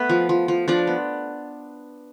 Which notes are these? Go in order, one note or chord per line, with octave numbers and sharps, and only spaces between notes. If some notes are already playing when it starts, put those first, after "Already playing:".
Already playing: A3 B3 B4
F3
F3
F3
F3 D4 D5
B3